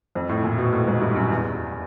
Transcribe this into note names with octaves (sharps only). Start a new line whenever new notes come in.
F2
A2
A#2
B2
A2
G#2
G2
F#2
E2